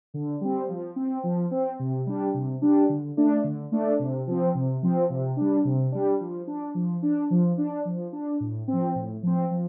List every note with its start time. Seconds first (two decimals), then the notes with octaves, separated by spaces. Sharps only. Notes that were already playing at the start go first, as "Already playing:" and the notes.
0.14 D3
0.41 G3 C4
0.69 F3
0.96 C4
1.24 F3
1.51 C4
1.79 C3
2.07 G3 D4
2.34 C3
2.62 G3 D4
2.89 D3
3.17 A3 D4
3.44 D3
3.72 A3 D4
3.99 C3
4.27 F3 C4
4.55 C3
4.83 F3 C4
5.10 C3
5.37 G3 D4
5.65 C3
5.92 G3 D4
6.20 F3
6.48 D4
6.75 F3
7.03 D4
7.30 F3
7.58 D4
7.85 F3
8.13 D4
8.40 A2
8.68 F3 C4
8.95 A2
9.23 F3 C4
9.51 F3